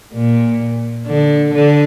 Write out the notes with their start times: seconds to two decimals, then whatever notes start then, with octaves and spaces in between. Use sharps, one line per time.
0.14 A#2
1.07 D3
1.54 D3